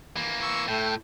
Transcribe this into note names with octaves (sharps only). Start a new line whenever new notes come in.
E3 A#3
C#6 E6
A2 A3 G5